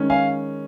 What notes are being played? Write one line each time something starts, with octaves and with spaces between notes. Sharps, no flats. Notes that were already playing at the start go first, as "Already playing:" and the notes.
Already playing: D#3 G#3 C#4
F5 G#5